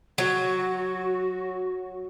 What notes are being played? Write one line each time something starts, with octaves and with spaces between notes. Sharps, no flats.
F#3 F#4